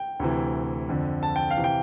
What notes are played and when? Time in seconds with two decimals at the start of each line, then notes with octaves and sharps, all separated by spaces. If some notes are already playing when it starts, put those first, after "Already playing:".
Already playing: G5
0.19 D2 C3 E3
0.89 F2 D3
1.23 A5
1.36 G5
1.51 F5
1.57 C3 E3
1.64 G5